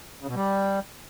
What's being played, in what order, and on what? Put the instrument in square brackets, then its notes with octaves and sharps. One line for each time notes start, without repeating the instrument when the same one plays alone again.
[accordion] C#3
B2
G3